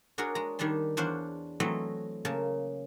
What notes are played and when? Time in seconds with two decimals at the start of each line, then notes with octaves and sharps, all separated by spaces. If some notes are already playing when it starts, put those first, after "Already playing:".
0.18 D4 F#4 G#4 A#4 C#5 A#5
0.35 G#3 A#5
0.59 D#3 G3 D4 A5 C6
0.97 E2 D4 C5 C#5 F5 F#5
1.60 E3 F#3 A3 C4 D#5
2.25 C#3 A#3 A5